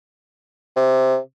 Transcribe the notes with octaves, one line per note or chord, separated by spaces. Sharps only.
C3